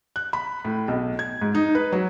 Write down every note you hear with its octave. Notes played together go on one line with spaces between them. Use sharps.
F#6
B5
A2
B1
G#6
G#2
D#4
B4
F#3